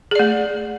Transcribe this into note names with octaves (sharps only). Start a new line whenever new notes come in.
A3 G#4 D5